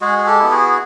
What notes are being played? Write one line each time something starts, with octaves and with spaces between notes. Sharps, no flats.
G#3 F#4 G#4
G#4
G4 A4
B3 E4
F#4 G#4